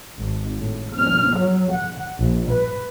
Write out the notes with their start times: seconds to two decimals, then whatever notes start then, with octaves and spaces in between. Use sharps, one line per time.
0.18 G#1
0.59 A2
0.93 F6
1.38 F#3
1.72 F#5
2.18 A#1
2.52 B4